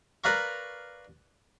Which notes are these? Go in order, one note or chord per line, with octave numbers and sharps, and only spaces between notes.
A#4 B4 D5 F5 A#5 C#6